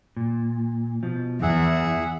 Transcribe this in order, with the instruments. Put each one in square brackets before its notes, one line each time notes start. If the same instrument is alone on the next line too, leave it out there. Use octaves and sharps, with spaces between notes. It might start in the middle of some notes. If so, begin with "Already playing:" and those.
[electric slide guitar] A#2
B2 F3
[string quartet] E2 [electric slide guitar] E3 [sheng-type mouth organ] G#4 E5 F#5